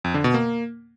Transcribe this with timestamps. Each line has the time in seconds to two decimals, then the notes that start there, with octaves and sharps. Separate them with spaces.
0.04 F2
0.14 D3
0.24 B2
0.34 A#3